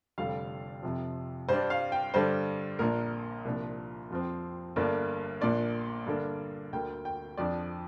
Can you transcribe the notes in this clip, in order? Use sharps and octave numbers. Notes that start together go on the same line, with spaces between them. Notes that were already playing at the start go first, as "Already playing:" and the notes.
F1 F2 D3 G3 F5
F2 C3 F3
G2 G3 D4 C5
F5
G5
G2 D3 G3 D4 C5
A#1 A#2 A#3 D4 A#4
C2 A#2 F3 D4
F2 F3 C4
G1 G2 D3 A#3 D4
A#1 A#2 A#3 D4 D5
G2 D3 A#3 D4
D2 D3 A#3 G5
G5
F2 F3 D4 D5